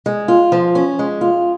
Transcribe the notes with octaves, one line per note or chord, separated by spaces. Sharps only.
G#3
F4
F3
C#4
G#3
F4